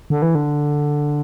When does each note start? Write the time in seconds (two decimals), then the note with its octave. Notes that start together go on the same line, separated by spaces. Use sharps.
0.10 D3
0.22 E3
0.35 D3